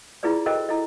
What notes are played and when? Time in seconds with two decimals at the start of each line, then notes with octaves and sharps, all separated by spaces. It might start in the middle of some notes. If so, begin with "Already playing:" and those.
0.23 E4 F4 G#4 B4 D5
0.46 F#4 A4 A#4 C5 D#5 G5
0.69 E4 A4 D#5